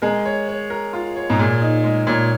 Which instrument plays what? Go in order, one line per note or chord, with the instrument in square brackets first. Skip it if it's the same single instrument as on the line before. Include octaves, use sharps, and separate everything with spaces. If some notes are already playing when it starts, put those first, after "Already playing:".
[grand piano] G#3 [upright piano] A#4
[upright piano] C#5
C#5
A#4
F4
C#5
[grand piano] G#2
[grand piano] A#2 [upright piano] G#4
[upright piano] D#4
G#3
[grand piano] A#2 [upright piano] C#5